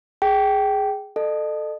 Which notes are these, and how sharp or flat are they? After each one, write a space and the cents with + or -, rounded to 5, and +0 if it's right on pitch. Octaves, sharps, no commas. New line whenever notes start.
G#4 +0 G5 -15
A4 +0 D#5 -40